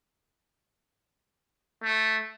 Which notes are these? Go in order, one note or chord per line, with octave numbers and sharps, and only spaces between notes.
A3